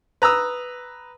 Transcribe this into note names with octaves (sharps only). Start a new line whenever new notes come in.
B4 A#5 D#6 E6